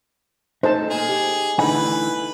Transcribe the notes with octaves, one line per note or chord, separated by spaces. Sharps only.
A3 D#4 A4 C5 A5
A#2 G#4
G4
D3 E3 A3 D#4 B4 F#5 G#5